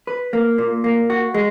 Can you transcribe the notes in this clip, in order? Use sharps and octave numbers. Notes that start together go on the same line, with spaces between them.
B4
A#3
A#2
A#3
F#4
G#3